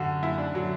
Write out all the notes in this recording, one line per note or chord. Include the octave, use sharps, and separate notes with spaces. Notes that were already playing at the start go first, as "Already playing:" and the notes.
Already playing: F#2 D3 F#4
F#2 E4
D4
D3 F#3